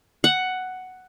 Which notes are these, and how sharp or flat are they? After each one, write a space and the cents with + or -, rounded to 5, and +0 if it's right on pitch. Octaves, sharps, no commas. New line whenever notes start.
F#5 +5